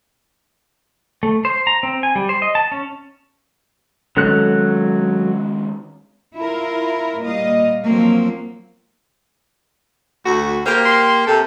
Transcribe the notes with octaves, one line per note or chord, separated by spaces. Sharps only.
A3
C5
A#5
C4
G#5
G3
C5
D#5
A5
C#4
D#3 F#3 G#3 C#4 A4 F#6
E4 F4 A#4
A#2 G3 D#5 F5
F3 F#3 A#3 C4
D2 F#4
A#3 G4 A#4 C5
C6
C3 A4